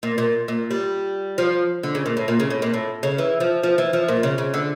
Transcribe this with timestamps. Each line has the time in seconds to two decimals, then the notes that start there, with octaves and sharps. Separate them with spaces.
0.03 A#2
0.18 A#2
0.48 A#2
0.71 G3
1.38 F3
1.83 D3
1.95 C#3
2.06 A#2
2.17 A2
2.28 A#2
2.40 C#3
2.50 A2
2.62 A#2
2.74 A2
3.03 C#3
3.18 E3
3.40 F3
3.63 F3
3.78 E3
3.93 F3
4.09 A#2
4.23 C#3
4.38 C#3
4.54 D3